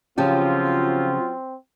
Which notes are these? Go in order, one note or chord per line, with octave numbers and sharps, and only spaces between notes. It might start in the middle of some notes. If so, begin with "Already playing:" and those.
C#3 F3 F#3 C4 C#4 F4 G4